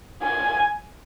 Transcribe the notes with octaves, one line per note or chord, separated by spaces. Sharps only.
G#5